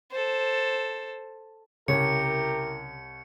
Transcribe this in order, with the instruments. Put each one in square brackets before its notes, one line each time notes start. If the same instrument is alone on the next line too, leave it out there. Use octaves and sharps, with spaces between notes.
[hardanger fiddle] A4 C5
[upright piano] C2 C#5 [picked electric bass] C#3 C#4 [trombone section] E4 G4 A#4 [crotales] C#7